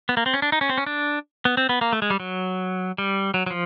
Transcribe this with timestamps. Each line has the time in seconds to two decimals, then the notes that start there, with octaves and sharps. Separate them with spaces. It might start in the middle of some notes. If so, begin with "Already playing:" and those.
0.09 B3
0.17 A#3
0.26 C4
0.34 C#4
0.42 D4
0.52 D#4
0.61 C#4
0.69 C4
0.78 C#4
0.86 D4
1.45 B3
1.57 C4
1.69 B3
1.81 A#3
1.93 A3
2.02 G#3
2.10 G3
2.20 F#3
2.98 G3
3.34 F#3
3.46 F#3
3.50 F3